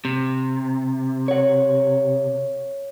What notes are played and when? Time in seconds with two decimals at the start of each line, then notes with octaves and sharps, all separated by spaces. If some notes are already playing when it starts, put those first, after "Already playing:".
0.05 C3
1.28 C#5 F#5